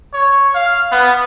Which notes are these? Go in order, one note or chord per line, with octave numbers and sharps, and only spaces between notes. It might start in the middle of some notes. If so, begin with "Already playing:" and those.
C#5
F5
B3